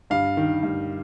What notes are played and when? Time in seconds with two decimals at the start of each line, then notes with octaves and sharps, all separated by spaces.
0.10 G2 F5
0.37 D#3
0.63 G2